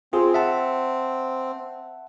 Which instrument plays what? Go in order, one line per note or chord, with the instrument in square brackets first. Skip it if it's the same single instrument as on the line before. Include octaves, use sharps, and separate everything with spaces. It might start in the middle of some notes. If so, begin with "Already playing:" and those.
[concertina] C4 [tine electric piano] F4 G#4
[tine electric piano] E5 F#5 A5